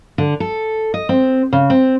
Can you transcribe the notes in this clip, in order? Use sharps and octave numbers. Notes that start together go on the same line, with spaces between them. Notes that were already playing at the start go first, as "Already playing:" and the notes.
D3
A4
D#5
C4
C#3
C4